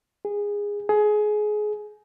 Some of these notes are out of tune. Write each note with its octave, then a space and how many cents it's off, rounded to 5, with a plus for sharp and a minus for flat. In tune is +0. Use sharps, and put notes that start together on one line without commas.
G#4 -20
G#4 +20